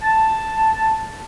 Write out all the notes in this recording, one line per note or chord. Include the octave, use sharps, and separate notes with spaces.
A5